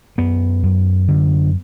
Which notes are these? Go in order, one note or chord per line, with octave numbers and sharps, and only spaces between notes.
F#2 B3
F#2
D3